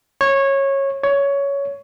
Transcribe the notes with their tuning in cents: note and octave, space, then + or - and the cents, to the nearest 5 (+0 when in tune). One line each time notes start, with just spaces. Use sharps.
C#5 -15
C#5 +15